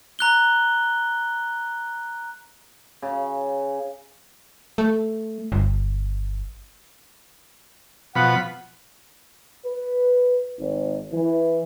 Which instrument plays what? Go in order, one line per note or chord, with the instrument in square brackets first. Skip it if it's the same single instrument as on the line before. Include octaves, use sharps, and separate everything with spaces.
[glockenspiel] A#5 F#6 G7
[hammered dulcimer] C#3
[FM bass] A3
G1
[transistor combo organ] B2 F3 B5 [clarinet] F#5
[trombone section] B4
G#1
E3